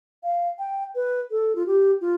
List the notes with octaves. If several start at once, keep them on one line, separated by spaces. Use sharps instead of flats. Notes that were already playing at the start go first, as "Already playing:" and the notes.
F5
G5
B4
A4
F4
G4
F4